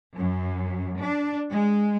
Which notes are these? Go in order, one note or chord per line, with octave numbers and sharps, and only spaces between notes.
F#2
D4
G#3